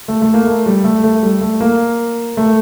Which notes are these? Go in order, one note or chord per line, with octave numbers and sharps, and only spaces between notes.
A3
A3
A#3
A3
G3
A3
A3
G3
A3
A#3
A3